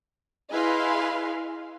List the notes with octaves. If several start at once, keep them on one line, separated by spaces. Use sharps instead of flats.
E4 G#4 B4 D#5 F5 C6